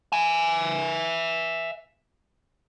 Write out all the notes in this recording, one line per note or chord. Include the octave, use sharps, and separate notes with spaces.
E5 G#5